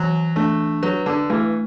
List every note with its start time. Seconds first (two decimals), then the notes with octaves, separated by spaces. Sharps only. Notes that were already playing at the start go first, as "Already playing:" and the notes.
Already playing: E3 F#3
0.36 A3 D4
0.82 F#3 B4
1.06 D3
1.30 E3 A3